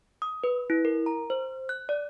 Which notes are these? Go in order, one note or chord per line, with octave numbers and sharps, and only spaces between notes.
D#6
B4
E4
A#4
A#5
C5
F#6
D5